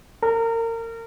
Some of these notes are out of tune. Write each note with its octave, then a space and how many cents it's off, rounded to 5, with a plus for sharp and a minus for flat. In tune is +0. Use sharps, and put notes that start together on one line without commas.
A#4 -30